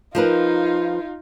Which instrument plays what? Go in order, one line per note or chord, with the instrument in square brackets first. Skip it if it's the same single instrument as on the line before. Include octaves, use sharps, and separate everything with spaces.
[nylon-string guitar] F3 A#4 B4 [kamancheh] D#4 F4